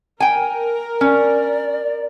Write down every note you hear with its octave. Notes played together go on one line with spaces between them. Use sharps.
A#4 G5 G#5
C#4 D5